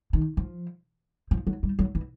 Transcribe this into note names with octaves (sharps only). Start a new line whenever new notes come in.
D#3
F3
F3
F#3
G3
F#3
E3